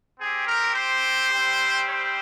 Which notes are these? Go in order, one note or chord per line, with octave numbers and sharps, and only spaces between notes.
C4 G4 G#4
A#4
C5
G3 C4 G4
C5